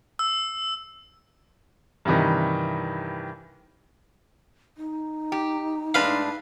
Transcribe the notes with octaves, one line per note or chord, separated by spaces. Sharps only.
E6
G2 C3 D#3 E3
D#4
G4
A2 G#3 D4 B4 F5